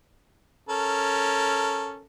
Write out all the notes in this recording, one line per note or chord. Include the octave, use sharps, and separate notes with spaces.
C#4 A4 A#4